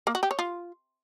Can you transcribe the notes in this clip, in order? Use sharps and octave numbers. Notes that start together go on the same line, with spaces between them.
A#3
F#4
G4
C#5
F4